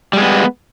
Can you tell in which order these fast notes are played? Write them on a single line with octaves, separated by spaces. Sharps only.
G3 G#3 B3